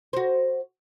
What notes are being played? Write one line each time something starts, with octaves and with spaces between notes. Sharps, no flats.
F#4 C5